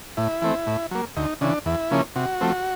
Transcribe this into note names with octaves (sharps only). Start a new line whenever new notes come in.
A2 E4
E3 A3 C4
A2
F#3 A#3
D2 D#4
C#3 E3 D4
E2 E4
C#3 F3 A#3 C#4
C3 F#4
F3 A3 C4